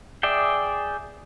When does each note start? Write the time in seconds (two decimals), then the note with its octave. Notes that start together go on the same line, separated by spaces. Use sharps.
0.23 G#4 D5 E5 G5